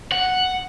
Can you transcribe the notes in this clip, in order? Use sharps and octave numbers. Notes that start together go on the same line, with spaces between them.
F#5